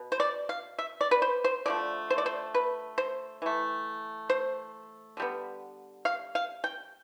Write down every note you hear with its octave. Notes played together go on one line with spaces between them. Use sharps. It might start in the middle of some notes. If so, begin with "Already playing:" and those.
Already playing: B2 B3
C5
D5
F5
E5
D5
B4
C5
C5
D3 F3 A3 D5
C5
D5
C5
B4
C5
E3 A3
C5
D3 G3 B3
F5
F5
G5